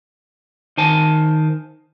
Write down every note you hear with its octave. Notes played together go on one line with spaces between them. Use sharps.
D#3 C5 G#5 A5